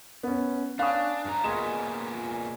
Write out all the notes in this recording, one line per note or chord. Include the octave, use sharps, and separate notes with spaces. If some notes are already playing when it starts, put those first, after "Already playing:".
B3 C#4
C#4 D4 B4 F5 D#6
G2 D4 A#5
A#2 G#3 A#3 B3 G#5 E7